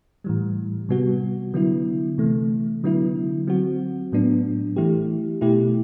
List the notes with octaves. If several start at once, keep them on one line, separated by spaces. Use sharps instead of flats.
A2 E3 G3
C3 G3 B3 F#4
D3 F#3 B3 E4
C3 E3 A3
D3 F#3 B3 E4
F#3 C4 F#4
A2 F#3 B3 D4
E3 A3 E4 G4
B2 A3 E4 G4